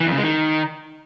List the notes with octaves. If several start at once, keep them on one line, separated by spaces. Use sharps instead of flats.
E3
F2
C#3
G#3
D#3